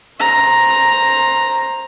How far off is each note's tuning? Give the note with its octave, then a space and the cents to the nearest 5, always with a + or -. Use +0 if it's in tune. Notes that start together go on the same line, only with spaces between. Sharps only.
C5 +20 A#5 +0